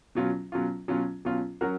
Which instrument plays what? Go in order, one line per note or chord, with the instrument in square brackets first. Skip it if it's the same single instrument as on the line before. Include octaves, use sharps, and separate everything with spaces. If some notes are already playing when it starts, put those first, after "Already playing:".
[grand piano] B2 F#3 C#4 F4
B2 F#3 C#4 F4
B2 F#3 C#4 F4
B2 F#3 C#4 F4
F#3 C#4 F#4 A#4